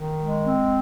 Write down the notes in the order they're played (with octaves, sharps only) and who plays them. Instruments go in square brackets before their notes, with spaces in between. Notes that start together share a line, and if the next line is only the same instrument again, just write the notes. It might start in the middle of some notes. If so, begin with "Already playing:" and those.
Already playing: [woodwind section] D#3
G#3
C4